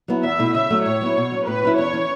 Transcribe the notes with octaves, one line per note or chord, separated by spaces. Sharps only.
F#3 B3 E4
E2 E5
B2 A3 E4
C#3 E5
F#3 A3
A2 C#5
F#3 B3 E4
B2
F#3 C#4
A2 B4
F#3 C#4 E4
E2 C#5
E3 C#4